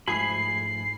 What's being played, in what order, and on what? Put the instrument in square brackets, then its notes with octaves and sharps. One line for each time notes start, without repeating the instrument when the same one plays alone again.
[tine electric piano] G#2 F3 A3 [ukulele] G#4 [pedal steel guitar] B5 [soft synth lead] C7